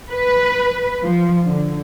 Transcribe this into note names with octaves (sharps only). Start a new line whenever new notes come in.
B4
F3
D3